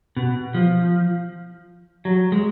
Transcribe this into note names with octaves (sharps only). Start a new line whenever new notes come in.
B2
F3
F#3
G#3